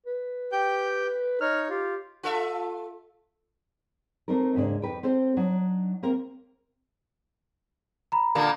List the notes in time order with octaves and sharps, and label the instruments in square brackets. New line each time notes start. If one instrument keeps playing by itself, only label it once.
[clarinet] B4
[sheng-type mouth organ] G4 G5 G6
[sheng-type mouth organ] D#4 C#5 [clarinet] F6
[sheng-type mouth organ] F4 [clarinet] G4
[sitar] F4 A4 E5
[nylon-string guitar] A3 A#3 C4 D#4 A#4
D#2 G#2 C#3 D4
F2 B4 G5
C4 A4 C5
F#3 D4 D#4
A#3 C4 A#4
[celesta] A#5 B5
[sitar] A#2 D3 A#3